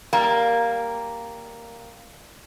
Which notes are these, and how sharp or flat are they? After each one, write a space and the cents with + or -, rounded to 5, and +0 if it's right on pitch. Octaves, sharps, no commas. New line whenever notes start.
G3 +0 A#3 +0